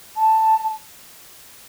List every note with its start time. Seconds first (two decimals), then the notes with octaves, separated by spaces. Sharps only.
0.16 A5